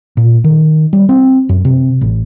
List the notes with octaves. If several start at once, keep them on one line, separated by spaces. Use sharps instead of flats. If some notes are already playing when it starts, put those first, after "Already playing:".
A#2
D#3
G3
C4
F#2
C3
A1